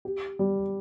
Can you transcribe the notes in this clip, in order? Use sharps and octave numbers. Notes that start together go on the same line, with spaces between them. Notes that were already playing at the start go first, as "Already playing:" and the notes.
G4
G3